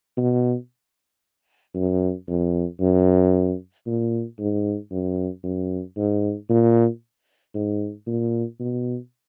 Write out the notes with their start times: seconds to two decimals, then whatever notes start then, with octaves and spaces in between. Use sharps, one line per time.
0.18 B2
1.75 F#2
2.28 F2
2.81 F#2
3.86 A#2
4.39 G#2
4.92 F#2
5.44 F#2
5.97 G#2
6.50 A#2
7.55 G#2
8.07 A#2
8.60 B2